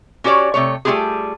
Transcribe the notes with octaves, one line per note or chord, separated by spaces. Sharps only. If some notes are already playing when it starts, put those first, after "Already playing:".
C#4 F#4 G4 C#5 D5
C3 A3 C#5
G3 A3 E4 F4 G4 G#4